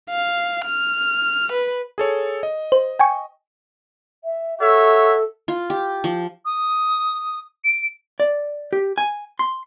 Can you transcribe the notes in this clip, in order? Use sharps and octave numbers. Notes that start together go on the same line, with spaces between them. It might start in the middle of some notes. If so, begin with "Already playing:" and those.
F5
F6
B4
G#4 A4 C#5
D#5
C5
G5 G#5 C#6
E5
F#4 A4 C#5 E5
F4
G4
F3
D#6
D7
D5
G4
G#5
C6